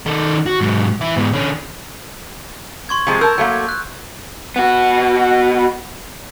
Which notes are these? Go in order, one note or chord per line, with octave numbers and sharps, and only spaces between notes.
D#3 A4
F#4
G#2 F#3
E3 E4
G#2 B3
D3 C#4
C6 C#6 G#6
C3 F3 G#3
A#4 A5 E6 G6
F#3 A3 A#3
F#6
B3 F#4